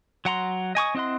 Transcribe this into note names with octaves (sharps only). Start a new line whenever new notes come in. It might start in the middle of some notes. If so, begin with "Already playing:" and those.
F#3 F#5 A#5 C6
D#5 G#5 C#6 D#6
C4 E4 D#5 F#5 C6